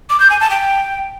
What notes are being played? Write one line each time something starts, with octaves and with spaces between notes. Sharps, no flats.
D6
G6
G#5
A5
G5